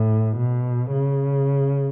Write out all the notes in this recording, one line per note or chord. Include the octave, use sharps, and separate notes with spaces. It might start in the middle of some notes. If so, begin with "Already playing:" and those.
Already playing: A2
B2
C#3